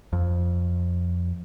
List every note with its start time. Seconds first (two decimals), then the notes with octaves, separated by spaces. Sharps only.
0.13 F2